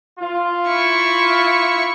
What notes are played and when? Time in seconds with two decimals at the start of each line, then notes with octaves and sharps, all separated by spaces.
0.19 F4
0.68 E4 C#6